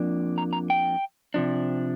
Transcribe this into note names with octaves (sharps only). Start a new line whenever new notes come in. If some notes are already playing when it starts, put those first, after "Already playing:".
Already playing: F2 F3 A#3 D4
A#5
A#5
G5
C3 F3 D4